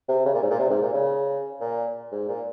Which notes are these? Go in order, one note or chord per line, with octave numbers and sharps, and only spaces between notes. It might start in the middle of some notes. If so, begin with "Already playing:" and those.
C3
C#3
A#2
G#2
A#2
C3
G#2
A#2
C#3
A#2
G#2
A#2